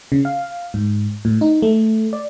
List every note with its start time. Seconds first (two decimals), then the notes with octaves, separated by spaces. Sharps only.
0.12 C#3
0.25 F5
0.74 G#2
1.25 A2
1.41 D#4
1.62 A3
2.13 D5